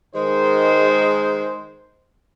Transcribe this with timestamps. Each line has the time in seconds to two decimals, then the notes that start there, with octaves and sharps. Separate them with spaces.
0.14 D#3 G#3 C5